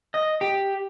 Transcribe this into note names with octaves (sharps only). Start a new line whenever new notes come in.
D#5
G4